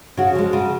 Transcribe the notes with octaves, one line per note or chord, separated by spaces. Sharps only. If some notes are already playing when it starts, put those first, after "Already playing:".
C#3 F#4
F3 G#3
C#3